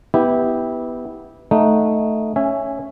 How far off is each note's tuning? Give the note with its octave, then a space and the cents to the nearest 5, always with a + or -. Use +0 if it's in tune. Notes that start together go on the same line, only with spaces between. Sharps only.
B3 +0 E4 -20 G4 +0
A3 +0 D#4 +0 F#5 -10
C#4 +0 E5 +10 G#5 -15